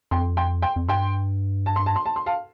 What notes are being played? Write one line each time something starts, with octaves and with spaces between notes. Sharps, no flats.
F2 G5 C6
G5 C6
G5 C6
F2
G2 G5 C6
A5
C6
A5
C6
A5
C6
F5 A5